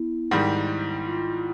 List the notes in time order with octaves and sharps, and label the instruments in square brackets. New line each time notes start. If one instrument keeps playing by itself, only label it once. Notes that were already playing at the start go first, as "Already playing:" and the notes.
Already playing: [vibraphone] B3 E4
[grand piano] G#2 D#3 G3
[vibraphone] F4